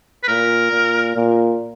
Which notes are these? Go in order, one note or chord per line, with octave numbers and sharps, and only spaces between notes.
B4
A#2 A#4
A#2
A#2